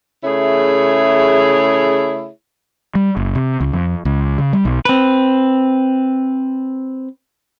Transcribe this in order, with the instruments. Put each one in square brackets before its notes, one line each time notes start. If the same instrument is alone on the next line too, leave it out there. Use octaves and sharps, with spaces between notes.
[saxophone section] C#3 A3 E4 G#4 C#5
[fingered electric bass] G3
F#1
C3
C#2
F2
C#2
C#3
G3
B1
[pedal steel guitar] C4 B4